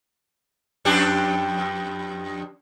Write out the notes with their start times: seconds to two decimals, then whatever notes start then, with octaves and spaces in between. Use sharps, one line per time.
0.85 F2 D4 G4